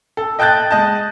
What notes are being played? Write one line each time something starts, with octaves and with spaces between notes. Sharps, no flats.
A4
D#5 G5 A5 F#6 G6 A6
G#3 D#5 A5